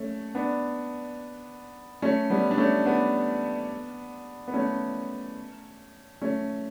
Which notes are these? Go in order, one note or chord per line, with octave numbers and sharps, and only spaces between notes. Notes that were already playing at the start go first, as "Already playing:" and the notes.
Already playing: A3 C#4
B3 D4
A3 C#4
G3 B3
D4
A3 C#4
B3 D4
B3
A3 C#4
A3 C#4